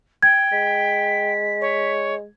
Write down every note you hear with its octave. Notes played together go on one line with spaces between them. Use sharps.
G5 G#6
G#3 B6
C#5